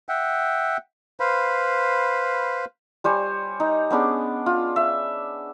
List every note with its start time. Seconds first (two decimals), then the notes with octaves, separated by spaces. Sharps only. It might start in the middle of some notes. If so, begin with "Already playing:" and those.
0.09 E5 F#5 G5
1.20 B4 C5 F5 B5
3.04 G3 C5 C#5 G#5
3.60 D#4
3.90 B3 C#4 D4 G#4
4.46 F4
4.76 E5